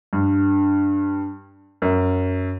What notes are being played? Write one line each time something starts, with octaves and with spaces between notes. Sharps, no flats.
G2
F#2